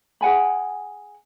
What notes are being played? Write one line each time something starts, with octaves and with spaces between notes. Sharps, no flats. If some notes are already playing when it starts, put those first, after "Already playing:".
G#4 F#5 G#5 B5